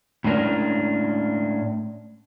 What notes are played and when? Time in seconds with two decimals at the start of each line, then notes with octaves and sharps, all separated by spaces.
0.24 A2 G#3 C#4 D4 A#4 B4